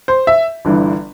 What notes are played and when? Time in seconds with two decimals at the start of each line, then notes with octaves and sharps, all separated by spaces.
0.08 C5
0.27 E5
0.65 G1 G2 E3